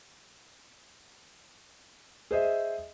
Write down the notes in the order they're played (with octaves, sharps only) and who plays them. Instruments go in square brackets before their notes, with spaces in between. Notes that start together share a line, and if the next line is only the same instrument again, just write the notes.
[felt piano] G#4 C5 D#5 E5